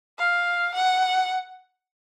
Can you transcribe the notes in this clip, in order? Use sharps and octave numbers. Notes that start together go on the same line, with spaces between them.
F5
F#5